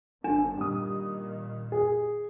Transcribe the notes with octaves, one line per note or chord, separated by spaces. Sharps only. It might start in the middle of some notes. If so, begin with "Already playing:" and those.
G1 D3 D4
A#2 D#3 G3 D#6
G#4